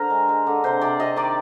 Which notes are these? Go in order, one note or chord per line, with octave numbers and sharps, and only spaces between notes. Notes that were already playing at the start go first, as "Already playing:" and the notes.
Already playing: D3 A#4 C5
G#3
G#3
D3
C3 C5
C3 D5
C3 D#5
D#3 D5